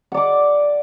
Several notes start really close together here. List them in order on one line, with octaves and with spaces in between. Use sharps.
F#5 D5 D6